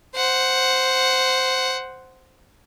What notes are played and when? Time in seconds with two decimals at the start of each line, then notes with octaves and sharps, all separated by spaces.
0.15 C5 F#5